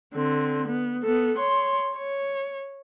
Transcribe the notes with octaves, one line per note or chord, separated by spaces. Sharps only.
D3 C4
B3
B3 A4
C#5 C6
C#5